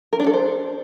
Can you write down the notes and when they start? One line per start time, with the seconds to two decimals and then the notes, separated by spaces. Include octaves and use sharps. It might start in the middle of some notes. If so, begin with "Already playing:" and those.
0.13 A#4
0.20 D4
0.27 A4
0.34 C5